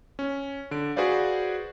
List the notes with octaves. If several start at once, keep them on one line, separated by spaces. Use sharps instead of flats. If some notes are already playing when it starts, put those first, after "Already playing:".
C#4
D3 D7
F#4 G#4 B4 C5 D5 F5